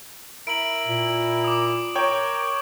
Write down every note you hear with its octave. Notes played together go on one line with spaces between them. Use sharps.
E4 A#4 E5 D7 F#7
A#2
D6 D#6
A#4 C#5 G5